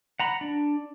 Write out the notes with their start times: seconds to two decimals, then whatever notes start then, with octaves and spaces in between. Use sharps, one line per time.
0.20 F#5 A#5 B5
0.41 D4